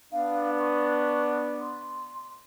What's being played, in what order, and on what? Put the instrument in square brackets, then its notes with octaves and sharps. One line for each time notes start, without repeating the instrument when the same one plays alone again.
[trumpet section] B3 D4 [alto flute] F5
[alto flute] C#6
C6